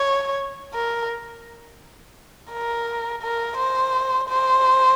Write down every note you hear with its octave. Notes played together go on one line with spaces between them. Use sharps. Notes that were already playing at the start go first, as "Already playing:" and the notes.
Already playing: C#5
A#4
A#4
A#4
C5
C5